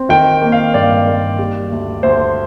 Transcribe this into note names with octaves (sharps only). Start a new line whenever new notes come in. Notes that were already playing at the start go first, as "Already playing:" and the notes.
Already playing: C4
D#3 G5
A#3
F5
G2 D5
A#3
G3
D2
D2 C5